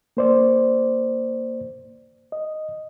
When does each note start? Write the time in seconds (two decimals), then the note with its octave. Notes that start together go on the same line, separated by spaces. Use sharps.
0.17 A#3 C5 D5
2.32 D#5